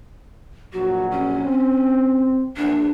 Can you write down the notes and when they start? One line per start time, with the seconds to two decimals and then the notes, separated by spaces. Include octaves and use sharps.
0.73 A#1 F#3 F#4
1.11 C#4
1.44 C4
2.57 A#1 E2 D4